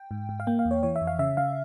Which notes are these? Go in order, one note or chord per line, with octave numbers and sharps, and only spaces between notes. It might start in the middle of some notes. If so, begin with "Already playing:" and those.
Already playing: G5
G#2
G#2
F5
A#3 G5
F5
E2
C#5
E3 C#5
E5
F2
F5
C#3 E5
C#3 F5